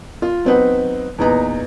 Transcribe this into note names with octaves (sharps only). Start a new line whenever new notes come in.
F4
F#3 B3 C4 D#4 B4 F#5
E2 A#2 D#4 B4 A#5